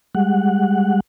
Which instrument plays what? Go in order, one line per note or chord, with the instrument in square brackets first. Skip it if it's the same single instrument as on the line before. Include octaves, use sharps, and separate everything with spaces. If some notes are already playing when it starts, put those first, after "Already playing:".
[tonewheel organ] G3 G#3 F#5